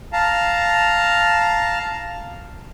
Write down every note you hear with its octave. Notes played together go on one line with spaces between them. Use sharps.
F5 A5 A#5